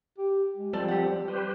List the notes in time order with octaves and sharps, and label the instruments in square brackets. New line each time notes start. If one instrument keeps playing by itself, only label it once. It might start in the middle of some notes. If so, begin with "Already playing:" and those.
[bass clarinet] G4
G#3
[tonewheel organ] F3 G3 C4 [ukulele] A4 D5 A5
[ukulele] G4 F#5
[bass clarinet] G3 [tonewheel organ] G4 B4 C5